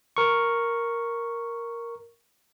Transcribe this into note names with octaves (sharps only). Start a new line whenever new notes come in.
A#4 C#6